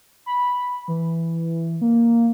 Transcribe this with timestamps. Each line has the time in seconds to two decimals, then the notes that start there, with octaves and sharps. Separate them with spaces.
0.26 B5
0.88 E3
1.81 A#3